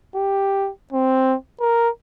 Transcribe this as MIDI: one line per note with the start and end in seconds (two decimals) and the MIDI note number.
0.15 0.70 67
0.93 1.35 60
1.60 1.89 70